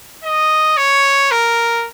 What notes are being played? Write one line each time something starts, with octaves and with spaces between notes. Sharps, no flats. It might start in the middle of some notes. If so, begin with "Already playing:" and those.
D#5
C#5
A#4